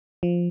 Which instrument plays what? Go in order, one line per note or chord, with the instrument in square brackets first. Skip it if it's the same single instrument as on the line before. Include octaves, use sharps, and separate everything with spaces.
[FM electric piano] F3